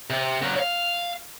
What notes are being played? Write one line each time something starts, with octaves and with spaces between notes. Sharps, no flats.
C3
C#3 F#3
F5